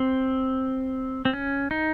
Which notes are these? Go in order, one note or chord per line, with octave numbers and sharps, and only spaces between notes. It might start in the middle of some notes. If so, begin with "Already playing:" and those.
Already playing: C4
C4
C#4
D#4